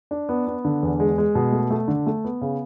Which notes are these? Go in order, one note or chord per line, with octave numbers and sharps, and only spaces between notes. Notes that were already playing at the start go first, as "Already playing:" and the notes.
D4
B3
B3
D3
E2
G#3
G#3
B2
A3
A3
D3
A3
B3
C#3